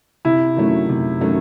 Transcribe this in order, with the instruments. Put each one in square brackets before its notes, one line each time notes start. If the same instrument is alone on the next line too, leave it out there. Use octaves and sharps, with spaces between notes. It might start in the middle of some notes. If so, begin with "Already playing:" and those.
[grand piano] C3 [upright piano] E4
[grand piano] D#3 F#3 A3 C#4
C3
D#3 F#3 A3 C#4